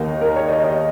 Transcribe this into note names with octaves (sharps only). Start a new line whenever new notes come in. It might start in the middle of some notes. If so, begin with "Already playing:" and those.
Already playing: D#2 D#3 A#3 D#4
A#4
C#5
D#5
D#5